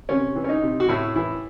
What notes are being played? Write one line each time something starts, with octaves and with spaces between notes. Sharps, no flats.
C3 C#4
E3
C#4
D#4
C3
F#4
A2 E4
E3 E4